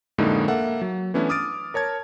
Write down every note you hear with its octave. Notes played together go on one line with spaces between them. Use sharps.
F2 A2 D3 G#3 A#3 D#4
A#3 A4 E5 F#5
F#3
E3 A3 B3 C#4 D4 E4
D6 D#6 F6 A6 D7
A#4 C#5 A5 G#6